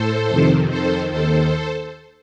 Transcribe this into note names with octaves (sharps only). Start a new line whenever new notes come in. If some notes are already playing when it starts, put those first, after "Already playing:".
Already playing: A2 A4 C5
F2 C3 D#3
F2 D#3 A4 C5
D#2 D#3 A4 C5